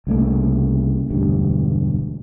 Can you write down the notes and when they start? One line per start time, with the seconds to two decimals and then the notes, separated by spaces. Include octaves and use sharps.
0.07 C2 C#3 A3 A#3
1.11 E1 D2 G2